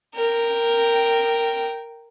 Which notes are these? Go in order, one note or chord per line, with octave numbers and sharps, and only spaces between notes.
A#4 G5